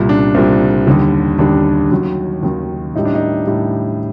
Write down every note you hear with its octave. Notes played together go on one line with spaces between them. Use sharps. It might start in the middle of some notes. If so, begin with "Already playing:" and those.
Already playing: C2 A#2 G3
D4
C2 A#2 G3 C4
D#2 D3 G3
D#2 D3 G3 D4
D#2 D#3 F#3
D#2 D#3 F#3
A2 G3 D#4
D4
D#4
A2 G3